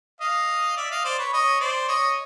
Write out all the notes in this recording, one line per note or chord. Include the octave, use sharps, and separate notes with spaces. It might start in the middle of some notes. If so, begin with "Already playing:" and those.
D#5 F5
D5 E5
D#5 F5
C5 D5
B4 C#5
C#5 D#5
C5 D5
C#5 D#5